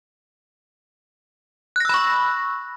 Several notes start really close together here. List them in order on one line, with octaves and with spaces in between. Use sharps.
F#6 A#6 E6 B5 C#6